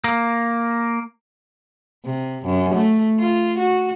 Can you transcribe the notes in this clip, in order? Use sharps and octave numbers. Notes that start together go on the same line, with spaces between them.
A#3
C3
F#2
A3
F4
F#4